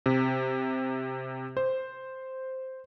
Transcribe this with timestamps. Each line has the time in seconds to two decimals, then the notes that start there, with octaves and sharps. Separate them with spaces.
0.06 C3
1.57 C5